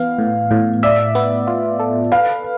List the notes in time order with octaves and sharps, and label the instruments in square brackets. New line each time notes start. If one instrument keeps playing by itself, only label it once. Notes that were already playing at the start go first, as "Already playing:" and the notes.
Already playing: [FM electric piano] E3 B3 [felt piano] F5
[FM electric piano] A2
A2
[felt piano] D5 [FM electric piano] E5
[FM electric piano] B3
F4
A4
[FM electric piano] B4 [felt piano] F5